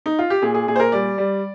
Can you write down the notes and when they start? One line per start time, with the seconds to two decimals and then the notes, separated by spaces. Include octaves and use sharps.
0.06 D#4
0.19 F4
0.30 G4
0.42 A#2 G#4
0.54 G#4
0.68 A#2 G#4
0.76 C5
0.80 A#4
0.92 G3 D5
1.18 G3